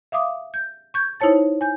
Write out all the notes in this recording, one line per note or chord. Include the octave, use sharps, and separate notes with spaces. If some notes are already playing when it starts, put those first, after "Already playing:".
E5 F5 D6 D#6
G6
C#6 G6 G#6
D#4 E4 C5 C#5 A5 A6
G#5 G6